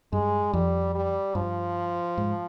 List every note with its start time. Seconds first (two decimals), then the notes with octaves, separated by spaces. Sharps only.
0.13 G2 G#3
0.53 F2 G3
0.95 G3
1.35 G2 F3
2.17 G#2